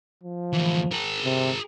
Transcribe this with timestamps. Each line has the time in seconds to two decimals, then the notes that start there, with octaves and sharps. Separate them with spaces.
0.23 F3
0.53 D2 E3
0.92 G#4 A#4
1.24 C3